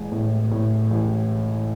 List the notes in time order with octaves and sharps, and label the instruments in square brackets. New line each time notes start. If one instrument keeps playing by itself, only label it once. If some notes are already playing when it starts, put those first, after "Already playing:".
Already playing: [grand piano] A1 G#3
A2
A2
A1